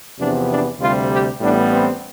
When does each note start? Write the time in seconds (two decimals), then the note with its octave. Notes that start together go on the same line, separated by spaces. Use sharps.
0.19 E2 C3 F3 B3 D4
0.49 D4
0.80 D2 C3 G3 F4
1.10 G4
1.40 A1 A2 G3 B3 D4
1.71 C4